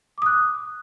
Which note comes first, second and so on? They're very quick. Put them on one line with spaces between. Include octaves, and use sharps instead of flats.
D6 D#6 F#6